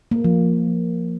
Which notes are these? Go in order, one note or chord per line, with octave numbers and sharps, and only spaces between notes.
A#3
F3